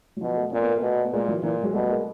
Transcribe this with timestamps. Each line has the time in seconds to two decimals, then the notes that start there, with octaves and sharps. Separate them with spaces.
0.17 F#3
0.21 B2 F3
0.37 A3 B3
0.52 A#2 C4
0.60 B3
0.69 A#3
0.76 A3 B3
0.83 B2
1.05 B3
1.13 A#2 G#3 A#3
1.28 E3 F#3
1.43 A#2 E3
1.63 F#3 G#3
1.73 B2 G3 A3
1.89 G#3 A#3